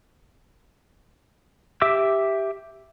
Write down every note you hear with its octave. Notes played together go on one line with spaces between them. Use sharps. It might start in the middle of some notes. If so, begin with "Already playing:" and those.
G4 E5 D6 E6